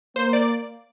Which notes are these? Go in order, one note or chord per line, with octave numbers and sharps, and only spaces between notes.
A#3 C5
D5